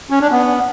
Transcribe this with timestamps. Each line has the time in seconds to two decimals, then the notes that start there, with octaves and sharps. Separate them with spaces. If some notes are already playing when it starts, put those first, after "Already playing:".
0.10 C#4
0.21 D4
0.32 B3